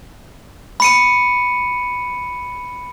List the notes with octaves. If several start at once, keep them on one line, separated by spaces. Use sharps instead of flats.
B5 C#7 D#7